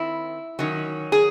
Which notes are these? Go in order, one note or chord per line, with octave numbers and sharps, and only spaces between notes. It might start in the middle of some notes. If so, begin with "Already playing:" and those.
Already playing: D#3 C4 E4
D#3 F#3 C#4
G#4